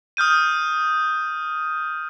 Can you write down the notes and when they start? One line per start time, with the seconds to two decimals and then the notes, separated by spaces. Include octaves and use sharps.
0.17 D#6 F6 G6 D#7